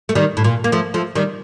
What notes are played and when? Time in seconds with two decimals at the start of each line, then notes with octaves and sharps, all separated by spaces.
0.09 A3
0.15 D#3 G3
0.37 A2
0.44 A#2
0.64 A#3
0.72 F3 A3
0.94 F3 A3
1.15 D#3 G3